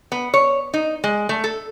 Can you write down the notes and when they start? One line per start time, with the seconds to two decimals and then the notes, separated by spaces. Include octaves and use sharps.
0.12 B3
0.34 C#5
0.74 D#4
1.04 G#3
1.29 A3
1.44 A4